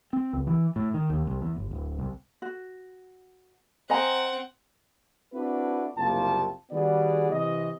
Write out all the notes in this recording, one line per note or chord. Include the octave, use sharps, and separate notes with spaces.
C4
C#2
E3
A2
D#3
D#2
C2
E2
G1
D1
C2
F#4
C4 D#5 F#5 G#5 A#5
C4 D4 E4 F#4 A4 B4
F#1 C2 A#3 F4 G5 A5
D#3 G3 B3 F#4 G#4 D5
C3 E3 D#5